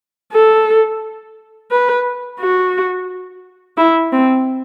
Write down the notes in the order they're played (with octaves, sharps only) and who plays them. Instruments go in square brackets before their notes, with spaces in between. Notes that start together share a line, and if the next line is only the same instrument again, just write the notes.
[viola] A4
B4
F#4
E4
C4